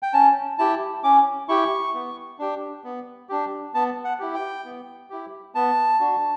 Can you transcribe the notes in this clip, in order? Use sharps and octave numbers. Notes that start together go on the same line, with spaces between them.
G5
C#4 A5
E4 G4 A5
C#4 D6
E4 G4 C#6
B3
D4 G4
B3
D4 G4
B3 A5
F#5
E4 G4
G5
B3
E4 G4
B3 A5
D4 F#4